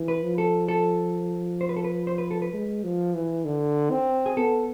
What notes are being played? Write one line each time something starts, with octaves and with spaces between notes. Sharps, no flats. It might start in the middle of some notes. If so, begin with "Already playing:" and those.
Already playing: E3
B4
F3
A4
A4
C5
B4
A4
B4
C5
B4
A4
B4
G#3
F3
E3
D3
C4
G#4
B3 A4